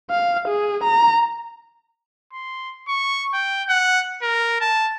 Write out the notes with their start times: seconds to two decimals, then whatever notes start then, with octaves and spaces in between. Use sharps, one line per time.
0.11 F5
0.48 G#4
0.84 A#5
2.33 C6
2.88 C#6
3.34 G5
3.69 F#5
4.22 A#4
4.60 A5